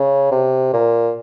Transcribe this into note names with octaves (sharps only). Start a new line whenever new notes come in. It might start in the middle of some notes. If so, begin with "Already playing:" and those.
Already playing: C#3
C3
A#2